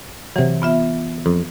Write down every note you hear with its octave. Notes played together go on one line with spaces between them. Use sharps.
C3 E3 F#3
B3 F4 E5
F2